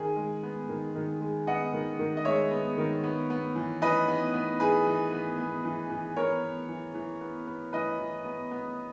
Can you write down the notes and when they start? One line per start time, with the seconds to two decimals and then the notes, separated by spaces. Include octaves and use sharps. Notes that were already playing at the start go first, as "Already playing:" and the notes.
Already playing: D#3 G#4
0.16 G#3
0.43 B3
0.69 D#3
0.95 D#3
1.21 G#3
1.47 B3 D#5 F#5
1.74 D#3
1.99 D#3
2.17 D#5
2.25 G#3 C#5 E5
2.51 B3
2.78 D#3
3.04 B3
3.30 B3
3.55 E3
3.82 E3 B4 D#5
4.08 B3
4.34 B3
4.60 E3 G#4 B4
4.86 E3
5.12 B3
5.38 B3
5.65 E3
5.90 E3
6.16 B3 A#4 C#5
6.43 B3
6.68 E3
6.94 E3
7.21 B3
7.47 B3
7.73 E3 B4 D#5
7.99 E3
8.25 B3
8.51 B3